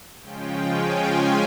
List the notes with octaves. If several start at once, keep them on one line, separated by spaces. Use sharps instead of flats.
C#3 F3 G#3 C#4 F4 G5
G#5